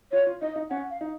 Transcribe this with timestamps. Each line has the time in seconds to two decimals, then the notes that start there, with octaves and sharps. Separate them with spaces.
0.12 F4 C#5
0.27 F4
0.41 D#4 D#5
0.56 D#4
0.70 C#4 F#5
0.91 F5
1.01 D#4